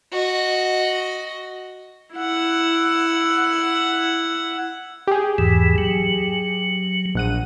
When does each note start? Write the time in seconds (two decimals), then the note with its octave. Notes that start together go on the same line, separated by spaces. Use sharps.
0.12 F#4 D#5
2.16 E4 F#5
5.07 G4 G#4
5.38 E2 G#2 E3
5.78 F#3
7.15 A#1 F#5 D#7